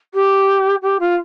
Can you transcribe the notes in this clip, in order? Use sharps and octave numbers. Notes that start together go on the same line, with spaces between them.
G4
G4
F4